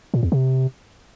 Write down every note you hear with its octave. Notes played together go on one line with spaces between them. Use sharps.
A#2
E2
C3